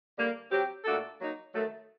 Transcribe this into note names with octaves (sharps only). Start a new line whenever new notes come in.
D3 G3 A#3
F#3 C4 G4
A#2 A3 D4 F#4 A4
F#3 A#3 D#4
D#3 F#3 A3